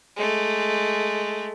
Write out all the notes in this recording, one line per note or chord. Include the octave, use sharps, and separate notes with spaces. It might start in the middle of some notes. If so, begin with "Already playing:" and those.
G#3 A3